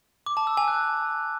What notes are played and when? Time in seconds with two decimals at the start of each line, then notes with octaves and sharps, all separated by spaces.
0.26 D6
0.37 A5
0.47 E6
0.57 G#5
0.68 F#6